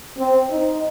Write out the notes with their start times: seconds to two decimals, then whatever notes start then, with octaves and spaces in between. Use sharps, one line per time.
0.17 C4
0.50 D#4